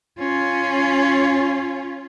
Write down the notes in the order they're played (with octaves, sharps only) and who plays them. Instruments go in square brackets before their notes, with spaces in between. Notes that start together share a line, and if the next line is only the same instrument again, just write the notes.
[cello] C#4 F4